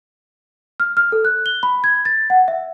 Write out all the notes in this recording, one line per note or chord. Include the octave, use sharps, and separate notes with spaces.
F6
F6
A4
F#6
G7
B5
G#6
A6
F#5
E5